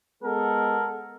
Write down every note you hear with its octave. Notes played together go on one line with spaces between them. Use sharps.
G#3 B3 A4 A#4 F#5